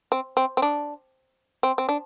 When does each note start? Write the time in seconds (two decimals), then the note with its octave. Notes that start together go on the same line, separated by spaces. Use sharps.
0.12 C4
0.37 C4
0.57 C4
0.62 D4
1.63 C4
1.78 C4
1.89 D4